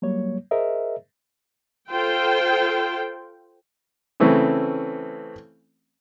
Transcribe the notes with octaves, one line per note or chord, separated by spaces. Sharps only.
F#3 G3 A#3 C#5
G#4 A#4 C5 D#5 E5
F4 A4 C5 G5
C#3 E3 A3 C4 C#4